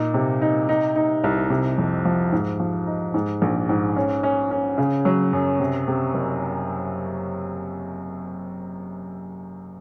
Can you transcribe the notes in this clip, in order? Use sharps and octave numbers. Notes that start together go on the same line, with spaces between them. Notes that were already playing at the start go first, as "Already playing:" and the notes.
Already playing: A#2 D#4
C3
D#4
D#4
D#4
C2
C3
F2
F3
G#2
F3
D#4
G#2
A#1
G#2
C#4
C#4
C#4
C#3
F#3
F#2
C3
C3
F#1